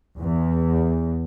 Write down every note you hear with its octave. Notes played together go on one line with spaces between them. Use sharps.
E2